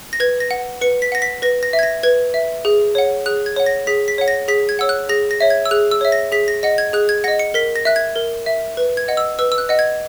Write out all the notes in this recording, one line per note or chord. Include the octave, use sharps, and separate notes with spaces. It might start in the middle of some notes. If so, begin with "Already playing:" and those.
A#6
B4 G#6
A#6
F#5
B4 C#7
B6
F#5 A#6
B6
B4 A#6
A#6
E5
G#6
A#6
B4 G#6
E5
G#4
C#5 F#5
G#4 F#6
G#6
C#5 F#5
A#6
G#4 B6
B6
C#5 F#5
A#6
G#4 B6
G#6
C#5 F#5 E6
F#6
G#4 A#6
A#6
C#5 E5
G#6
E6
G#4 F#6
E6
C#5 E5
A#6
G#4 B6
A#6
D#5 F#5 A#6
G#6
G#4 F#6
G#6
D#5 F#5 A#6
C#7
A#4 B6
A#6
E5 F#6
G#6
A#4
E5
B4
G#6
D#5 F#5
E6
B4 E6
E6
F#6
D#5 F#5
G#6